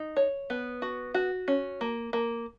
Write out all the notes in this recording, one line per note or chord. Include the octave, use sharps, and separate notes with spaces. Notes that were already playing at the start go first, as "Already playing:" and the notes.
Already playing: D#4
C#5
B3
F#4
F#4
C#4
A#3
A#3